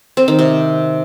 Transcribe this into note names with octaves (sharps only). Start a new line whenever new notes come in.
C4
D#3
C3